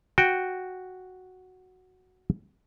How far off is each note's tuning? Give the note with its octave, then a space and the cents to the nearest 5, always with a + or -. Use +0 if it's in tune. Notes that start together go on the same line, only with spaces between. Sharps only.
F#4 +0 G5 +0